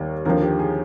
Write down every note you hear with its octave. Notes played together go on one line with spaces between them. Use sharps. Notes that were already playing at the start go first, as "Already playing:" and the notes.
Already playing: D#2 D#3 G3 A#3
D#2 D3 F3 A#4
G4
G#4